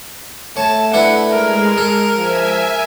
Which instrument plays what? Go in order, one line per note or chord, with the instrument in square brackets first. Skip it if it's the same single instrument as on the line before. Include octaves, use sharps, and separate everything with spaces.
[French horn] A3 [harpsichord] C#5 [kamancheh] A5
[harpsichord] D4 E4 B4 [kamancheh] F#5
[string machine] G#3 [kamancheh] A#4
[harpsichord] A4
[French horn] F3 [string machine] E5 G#5